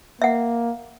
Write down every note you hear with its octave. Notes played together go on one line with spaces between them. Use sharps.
A#3 E5 F#5